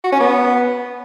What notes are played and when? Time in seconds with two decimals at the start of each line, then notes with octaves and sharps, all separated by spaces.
0.04 F#4
0.12 C#4
0.20 B3